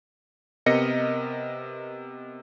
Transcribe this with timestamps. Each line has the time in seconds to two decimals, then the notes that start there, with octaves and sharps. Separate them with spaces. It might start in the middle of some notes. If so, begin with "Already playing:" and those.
0.66 C3 B3 A#4 D#5 A#6 C#7